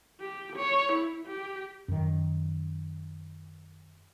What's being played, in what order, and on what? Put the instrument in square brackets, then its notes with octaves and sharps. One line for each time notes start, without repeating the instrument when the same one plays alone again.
[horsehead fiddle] G4
C#5
E4
G4
[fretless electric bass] F#2 D#3